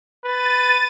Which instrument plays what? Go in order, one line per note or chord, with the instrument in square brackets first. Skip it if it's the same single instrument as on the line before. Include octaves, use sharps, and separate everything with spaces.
[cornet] B4 [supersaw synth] A6 D#7